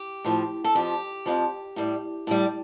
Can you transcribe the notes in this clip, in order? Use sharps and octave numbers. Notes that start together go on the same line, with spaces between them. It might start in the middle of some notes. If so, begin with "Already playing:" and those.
Already playing: G4
A2 F3
A4
F2 F3 G4
F2 F3
A2 G3
A2 G3